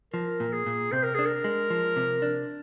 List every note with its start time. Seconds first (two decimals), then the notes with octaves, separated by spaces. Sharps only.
0.13 F3 A#4
0.40 A#2
0.53 G#4
0.66 A#2
0.92 C3 C5
1.03 A#4
1.15 D4 G#4
1.26 A#4
1.44 G#3
1.70 F3
1.96 C3
2.22 D4